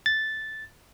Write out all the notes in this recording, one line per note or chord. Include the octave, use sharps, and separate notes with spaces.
A6